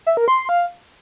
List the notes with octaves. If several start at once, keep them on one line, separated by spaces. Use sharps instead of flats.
E5
A#4
C6
C6
F5